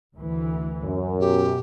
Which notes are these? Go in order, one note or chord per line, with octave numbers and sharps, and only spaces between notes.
D2 E3
F#2
B2 G4